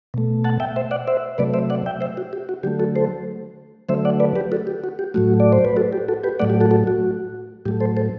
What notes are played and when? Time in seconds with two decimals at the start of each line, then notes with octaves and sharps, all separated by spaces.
0.14 B2 A3
0.44 F#5 A5
0.60 E5 G5
0.76 C5 E5
0.91 D5 F#5
1.08 C5 E5
1.38 C3 F#3 A3 B4 D5
1.54 C5 E5
1.70 D5 F#5
1.86 E5 G5
2.01 C5 E5
2.17 F#4
2.33 G4
2.49 F#4
2.63 D3 F#3 A3 G4
2.79 F#4 A4
2.96 A4 C5
3.89 D3 F#3 A3 C5 E5
4.05 D5 F#5
4.20 B4 D5
4.36 G4 B4
4.52 F#4 A4
4.67 G4
4.84 F#4
4.99 G4
5.14 A2 F#3 A3 F#4
5.40 D5
5.53 C5
5.65 B4
5.77 F#4 A4
5.93 G4
6.08 F#4 A4
6.24 G4 B4
6.40 A2 F#3 A3 D5 F#5
6.50 G4
6.60 F#4 A4
6.71 F#4 A4
6.87 F#4
7.66 A2 F#3 A3 G4
7.80 A4 C5
7.97 A4 C5